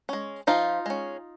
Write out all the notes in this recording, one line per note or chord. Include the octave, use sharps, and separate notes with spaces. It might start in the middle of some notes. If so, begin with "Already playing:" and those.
G#3 C#4
F3 D#4 F4
G#3 C#4